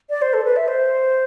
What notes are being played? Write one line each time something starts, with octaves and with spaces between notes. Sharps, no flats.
D5
C5
A4
B4
E5
C5